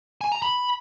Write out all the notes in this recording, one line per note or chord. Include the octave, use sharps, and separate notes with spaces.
G#5
A#5
B5